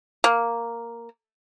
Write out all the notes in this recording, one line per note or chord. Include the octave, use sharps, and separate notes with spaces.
A#3